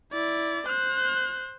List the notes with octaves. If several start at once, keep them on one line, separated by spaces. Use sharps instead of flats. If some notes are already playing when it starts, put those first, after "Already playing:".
E4 D5
C5 F#6